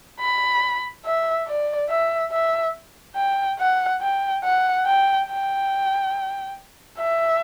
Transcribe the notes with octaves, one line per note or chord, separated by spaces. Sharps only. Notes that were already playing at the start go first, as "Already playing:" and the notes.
B5
E5
D5
E5
E5
G5
F#5
G5
F#5
G5
G5
E5